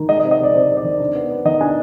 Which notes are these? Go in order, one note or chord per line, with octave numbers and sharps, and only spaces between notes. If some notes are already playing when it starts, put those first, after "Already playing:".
Already playing: D#3
G#3 D#5
D#5
C3
D#5
C3 D5
C3 C5
C3
D5
D#3
D4
B3
B3
D#3 D#5
D4 G#5